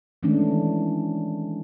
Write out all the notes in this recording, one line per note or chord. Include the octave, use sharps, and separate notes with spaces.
D#3 E3 G#3 A3 C#4 D4